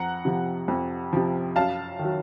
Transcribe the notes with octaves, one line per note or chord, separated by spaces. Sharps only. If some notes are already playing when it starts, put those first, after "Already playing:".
Already playing: F2 F#5 A#5
C3 F3
F2
C3 F3
F#2 F5 A5
D#3 F#3